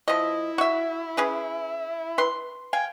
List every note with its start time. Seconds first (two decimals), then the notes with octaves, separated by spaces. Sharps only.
0.08 F3 E4 D#5
0.58 F#4 E5
1.17 C#4 G#4 B4
2.18 B4 C6
2.73 F5 G5 G#5